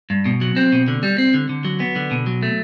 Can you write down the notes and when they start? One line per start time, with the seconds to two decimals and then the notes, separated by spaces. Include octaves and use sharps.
0.10 G2
0.26 B2
0.41 F#3
0.56 C4
0.72 B2
0.88 D3
1.03 G3
1.18 C4
1.34 D3
1.49 D3
1.65 F#3
1.80 B3
1.96 D3
2.11 B2
2.27 F#3
2.43 A3